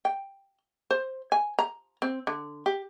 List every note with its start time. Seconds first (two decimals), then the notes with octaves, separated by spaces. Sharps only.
0.05 G5
0.91 C5
1.32 G#5
1.59 A#5
2.02 C4
2.27 D3
2.66 G4